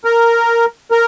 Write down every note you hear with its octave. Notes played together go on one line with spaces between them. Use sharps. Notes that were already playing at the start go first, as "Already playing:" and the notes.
A#4
A#4